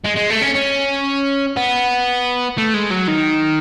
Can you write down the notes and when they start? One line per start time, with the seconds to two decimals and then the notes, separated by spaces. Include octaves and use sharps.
0.06 G#3
0.17 G#3
0.31 A3
0.43 C#4
0.55 C#4
1.57 B3
2.58 A3
2.74 G#3
2.91 F#3
3.08 D#3